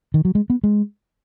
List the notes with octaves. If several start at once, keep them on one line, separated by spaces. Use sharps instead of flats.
D#3
F#3
G#3
B3
G#3